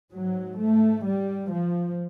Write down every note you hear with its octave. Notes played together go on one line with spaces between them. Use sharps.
G#2 F#3
A3
G3
F3